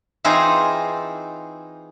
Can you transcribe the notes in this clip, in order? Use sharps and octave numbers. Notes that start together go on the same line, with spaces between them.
E3 C4 D#4 F4 G#4